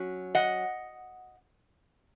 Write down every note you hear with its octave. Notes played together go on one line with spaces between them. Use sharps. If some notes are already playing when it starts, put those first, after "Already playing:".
Already playing: F#3 C#4
D#5 F#5